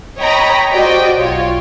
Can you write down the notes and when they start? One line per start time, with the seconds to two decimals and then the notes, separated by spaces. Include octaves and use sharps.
0.19 C#5 D#5 G5 A#5 B5
0.72 F#4 G4 C5 D5 D#5 G5
1.18 B1 F4 C#5